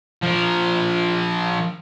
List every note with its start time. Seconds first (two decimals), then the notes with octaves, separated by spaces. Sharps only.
0.23 F3 A#4